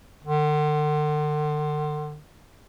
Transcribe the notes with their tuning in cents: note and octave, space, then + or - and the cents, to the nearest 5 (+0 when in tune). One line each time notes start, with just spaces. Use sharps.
D3 +40